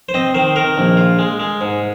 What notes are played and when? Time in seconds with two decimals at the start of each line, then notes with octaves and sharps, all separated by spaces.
0.09 C5
0.14 C4 D#5
0.34 D#3 C5
0.56 D#3 A#4
0.77 A#1
0.97 F4
1.19 G#3
1.40 G#3
1.61 G#2